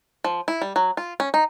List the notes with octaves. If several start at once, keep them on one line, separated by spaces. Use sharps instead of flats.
F3
E4
G3
F#3
F4
C#4
D#4